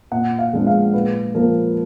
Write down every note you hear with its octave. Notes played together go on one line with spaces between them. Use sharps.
A#2 F#5
F5
F3 G#3 B3 D4
F5
A#2 B4
F3 A#3 A#4